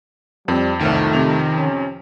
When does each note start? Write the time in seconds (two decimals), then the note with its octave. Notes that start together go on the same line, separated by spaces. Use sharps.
0.48 F2 G3 C4
0.81 F1 C2 D#3 A3
1.13 C3 F7
1.56 C#4